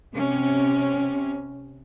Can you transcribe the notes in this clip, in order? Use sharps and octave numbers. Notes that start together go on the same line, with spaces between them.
C3 C#4